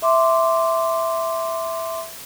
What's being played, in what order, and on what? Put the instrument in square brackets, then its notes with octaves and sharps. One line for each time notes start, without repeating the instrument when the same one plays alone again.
[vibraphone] E5 C6 D6